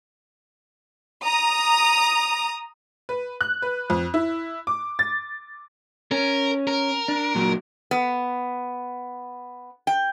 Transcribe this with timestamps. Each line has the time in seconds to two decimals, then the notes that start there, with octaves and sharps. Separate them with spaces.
1.23 A#5 D#6
3.09 B4
3.41 F#6
3.62 B4
3.90 F2
4.14 E4
4.67 D6
4.99 A6
6.11 C#4 A#4
6.67 A#4
7.08 D4
7.35 A#2 F#3
7.91 B3
9.87 G5